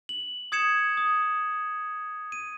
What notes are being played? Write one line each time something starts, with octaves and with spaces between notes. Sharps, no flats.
F#7
D#6 G#6 C#7 E7
D#6
D#7